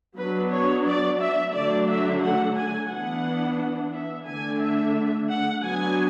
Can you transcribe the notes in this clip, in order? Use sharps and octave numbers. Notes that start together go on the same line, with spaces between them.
F#3 B3 D4 B4
C#5
D5
E5
D3 F#3 A3 D4 D5
E5
F#5
G#5
E3 B3 D4 F#5
E5
D3 A3 D4 G#5
E5
F#5
F#3 B3 D4 G#5